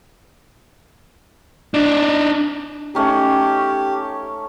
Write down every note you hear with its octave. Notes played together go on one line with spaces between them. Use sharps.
D4 D#4
A3 C#4 D#4 G4